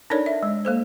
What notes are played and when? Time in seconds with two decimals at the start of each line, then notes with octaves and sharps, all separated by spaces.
0.10 D4 D#4 A4 A#4 C#5 D5
0.26 E5
0.43 G#3
0.65 A#3 A4 C5